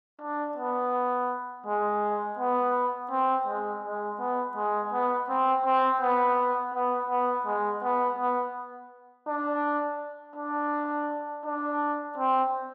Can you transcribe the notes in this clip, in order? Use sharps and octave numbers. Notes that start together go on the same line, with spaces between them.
D4
B3
G#3
B3
C4
G#3
G#3
B3
G#3
B3
C4
C4
B3
B3
B3
G#3
B3
B3
D4
D4
D4
C4